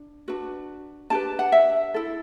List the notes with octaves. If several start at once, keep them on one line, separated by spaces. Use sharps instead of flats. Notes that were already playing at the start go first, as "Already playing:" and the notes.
Already playing: D4
D4 F#4 B4
D4 G4 B4 A5
F#5
E5
E4 A4